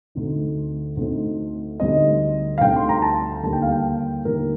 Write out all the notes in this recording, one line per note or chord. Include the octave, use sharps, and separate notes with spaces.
D2 D3 A3 C4 D#4
D2 D3 A3 C4 D#4
D2 D3 G3 C4 D#4 D#5
F5
D2 D3 G3 C4 D#4 G5
C6
A#5
A5
D#2 D3 G3 A#3 A5
G5
F5
G5
D#2 D3 G3 A#3 A#4